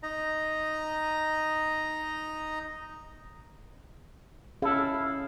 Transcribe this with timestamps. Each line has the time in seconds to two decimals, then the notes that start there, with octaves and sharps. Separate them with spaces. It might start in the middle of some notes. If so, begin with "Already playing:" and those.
0.03 D#4 D#5 A#5
4.62 C#4 E4 G#4 A4 F5